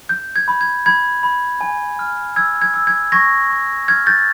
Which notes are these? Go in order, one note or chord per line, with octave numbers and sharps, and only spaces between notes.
G6
G#6
B5
G#6
B5 G#6
B5
G#5
F6
E6 G#6
G#6
E6
G#6
C#6 G#6 A#6
C#6
F6 G#6
G6 A6